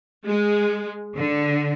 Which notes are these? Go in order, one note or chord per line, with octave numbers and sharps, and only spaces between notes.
G#3
D3